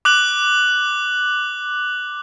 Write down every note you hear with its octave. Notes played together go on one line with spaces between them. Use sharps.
D6 F#6 F#7